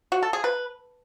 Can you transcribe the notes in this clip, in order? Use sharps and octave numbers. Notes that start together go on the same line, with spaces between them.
F#4
A4
G#4
B4